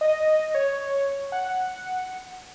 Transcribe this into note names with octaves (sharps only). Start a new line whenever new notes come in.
D#5
C#5
F#5